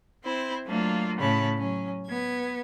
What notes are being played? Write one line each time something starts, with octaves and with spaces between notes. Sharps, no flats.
C4 E4 C5
F#3 A3 A#3 D4 F4
A2 C#3 C#5 A5 B5
F#3 C#4
B3 G#6